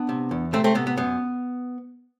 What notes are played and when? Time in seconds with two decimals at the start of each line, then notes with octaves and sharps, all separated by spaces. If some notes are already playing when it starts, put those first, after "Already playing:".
Already playing: B3 D4
0.09 C3
0.31 E2
0.53 C3 A3 C4
0.64 A3 C4
0.75 C3 B3
0.87 B3
0.97 F#2 B3